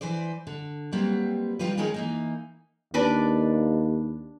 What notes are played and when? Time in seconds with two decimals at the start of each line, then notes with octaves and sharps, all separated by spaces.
0.01 E3 B4 C5 D5
0.47 D3
0.92 F#3 G3 A#3 C4 B4
1.59 C3 D#3 G3 F4 G4 B4
1.77 D#3 G#3 C#4 D#4 G#4 A#4
1.94 E3 A#3 D#4
2.94 D#2 D4 B4 D6